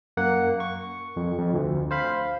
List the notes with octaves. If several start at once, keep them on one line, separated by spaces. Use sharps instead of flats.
F#2 A#3 F#5
C#6
F2
F2
D2
C5 F5 B5